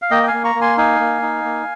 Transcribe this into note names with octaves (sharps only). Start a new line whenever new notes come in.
F5
A#3 D#5 G5
G5
F5 G#5
A#3
A#5 C#6
A#3
G#5 C6
D#4 F5 G#5
A#3
D#4
A#3